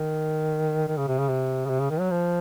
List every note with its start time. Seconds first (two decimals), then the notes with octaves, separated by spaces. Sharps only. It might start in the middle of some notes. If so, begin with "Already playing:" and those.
Already playing: D#3
0.88 D#3
0.98 C#3
1.07 C3
1.19 C#3
1.29 C3
1.66 C#3
1.69 C3
1.80 C#3
1.90 D#3
2.00 F#3
2.11 F3